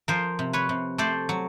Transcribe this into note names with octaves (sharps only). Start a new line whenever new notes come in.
F3 A#4 C5
C3
B4 C#5
C3
A3 C5 D5
F#3